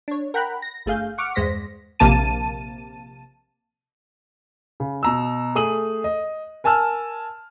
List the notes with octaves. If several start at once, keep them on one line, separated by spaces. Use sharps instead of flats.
D4 C#5
A#4 F#5 G5 A#5 B5 F#6
A#6
G1 A3 G#4 F5 G6
F#5 C#6 D6 F6 C#7
E2 G2 G#3 C5 A#6 B6
A#1 C3 A#3 A5 D#7
C#3
B2 A#5 E6
A3 G#4 D#6 D#7 F#7
D#5
A#4 G#5 A5 E6 F6